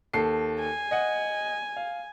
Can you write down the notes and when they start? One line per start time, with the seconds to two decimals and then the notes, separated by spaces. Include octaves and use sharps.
0.14 D#2 A4 C7
0.61 G#5
0.91 D#5 F#5
1.76 F5